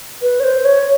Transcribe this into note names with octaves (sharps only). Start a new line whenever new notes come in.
B4
C#5
C5
C#5